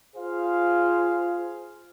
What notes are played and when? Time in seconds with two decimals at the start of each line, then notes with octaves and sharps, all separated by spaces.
0.15 F4 G#4 C5 F5